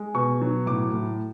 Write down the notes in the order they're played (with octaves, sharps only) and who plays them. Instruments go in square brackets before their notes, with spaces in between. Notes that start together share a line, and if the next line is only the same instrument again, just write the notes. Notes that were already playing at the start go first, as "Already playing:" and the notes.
Already playing: [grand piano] G#3
B2 C#6
F#3
A2 D6
A2